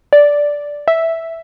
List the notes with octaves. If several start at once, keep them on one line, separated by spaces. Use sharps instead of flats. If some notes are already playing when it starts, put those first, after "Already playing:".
D5
E5